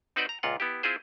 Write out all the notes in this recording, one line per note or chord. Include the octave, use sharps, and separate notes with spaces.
C4 D#4 F#4 B4 C5 D5
A#5
C#2 A#2 F4 F#5
B3 E4 G4
C4 E4 F4 G#4 C5